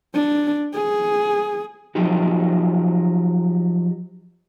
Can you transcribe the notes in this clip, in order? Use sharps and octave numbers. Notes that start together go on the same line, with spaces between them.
D4
G#4
F3 F#3 D#4 G4